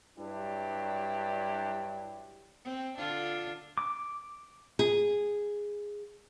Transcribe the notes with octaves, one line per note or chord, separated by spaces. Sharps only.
G2 F#3 D4 E4 G4
C4
D3 D4 F4
D6
G#4